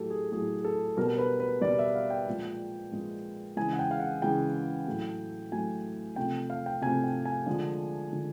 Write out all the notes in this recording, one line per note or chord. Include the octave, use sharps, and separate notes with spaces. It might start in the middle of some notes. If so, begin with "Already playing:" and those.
Already playing: A2 F#3 A3 G4 A4
G#4
A2 F#3 A3 G#4
A4
B2 G3 A#4
B4
B4
B2 G3 D5
E5
F5
G5
A#2 F3 G#3
A#2 F3 G#3
C#3 E3 G#3 G#5
F#5
G5
F5
F#5
C#3 E3 G#3 G5
A2 F#3 A3
A2 F#3 A3 G#5
C3 F3 A3 G5
F5
G5
C3 F3 A3 G#5
G5
G#5
D3 F3 G#3
D3 F3 G#3